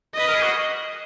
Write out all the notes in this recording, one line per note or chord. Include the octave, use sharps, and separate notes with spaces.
B4 D#5
A#4
G#4
F#4